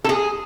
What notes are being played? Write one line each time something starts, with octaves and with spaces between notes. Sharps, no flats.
A4
G#4